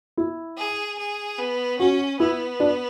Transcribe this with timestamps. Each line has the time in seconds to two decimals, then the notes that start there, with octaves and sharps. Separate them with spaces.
0.17 E4
0.57 G#4
0.99 G#4
1.38 B3
1.79 C#4 F#4
2.19 B3 E4
2.60 D4